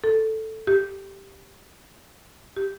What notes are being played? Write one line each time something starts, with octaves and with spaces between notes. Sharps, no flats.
A4
G4
G4